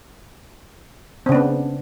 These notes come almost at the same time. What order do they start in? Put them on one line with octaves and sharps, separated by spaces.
C4 C#3 D4 B3